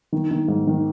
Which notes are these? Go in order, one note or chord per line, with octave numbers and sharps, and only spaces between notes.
D#3
D#3
G#2
D#3